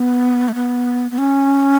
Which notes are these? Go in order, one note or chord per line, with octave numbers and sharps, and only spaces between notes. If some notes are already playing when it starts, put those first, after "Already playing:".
Already playing: B3
A3
B3
B3
C#4